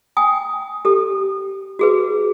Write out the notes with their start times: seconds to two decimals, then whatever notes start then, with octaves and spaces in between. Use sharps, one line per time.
0.17 G5 G#5 D#6
0.85 G4 A4
1.79 F#4 G#4 B4